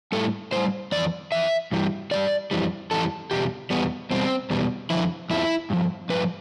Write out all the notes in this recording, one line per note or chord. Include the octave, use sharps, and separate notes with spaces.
A2 G3 A4
A2 G3 C5
F2 E3 D5
F2 E3 E5
G2 E3 G3
G2 E3 G3 D5
F2 E3 G3
F2 E3 G3 A4
E2 B2 G3 G4
E2 B2 G3 B3
E2 B2 G3 C4
E2 B2 G3
F2 D3 F3 E4
F2 D3 F3 E4
G2 F3
G2 F3 B4